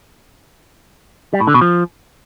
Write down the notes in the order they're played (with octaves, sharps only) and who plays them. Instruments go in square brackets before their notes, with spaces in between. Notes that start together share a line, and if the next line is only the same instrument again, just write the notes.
[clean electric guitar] G3
A2
D3
B2
F3